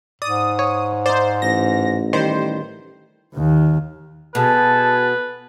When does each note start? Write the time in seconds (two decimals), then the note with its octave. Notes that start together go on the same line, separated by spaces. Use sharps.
0.22 G#2 D5 D#6
0.59 C#5
1.06 D#4 C5 D5
1.42 A1 A#6
2.13 D#3 G3 C5
3.35 D#2
4.35 B2 G#4 A4 B4 A5